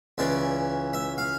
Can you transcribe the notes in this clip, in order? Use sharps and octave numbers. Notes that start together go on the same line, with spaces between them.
C#2 C#3 E3 D5
E5
F5